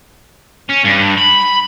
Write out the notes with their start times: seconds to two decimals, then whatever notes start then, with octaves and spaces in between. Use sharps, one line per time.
0.70 C#4
0.85 G2
1.18 B5